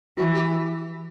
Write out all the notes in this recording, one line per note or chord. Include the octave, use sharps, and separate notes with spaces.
E3 F#4
G4